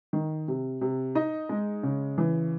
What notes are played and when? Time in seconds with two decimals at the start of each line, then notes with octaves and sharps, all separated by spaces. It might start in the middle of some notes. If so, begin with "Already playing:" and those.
0.13 D#3
0.48 C3
0.81 C3
1.15 D#4 D#5
1.49 G#3
1.83 C#3
2.18 E3